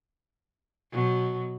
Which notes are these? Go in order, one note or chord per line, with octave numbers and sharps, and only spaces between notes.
B2 F#3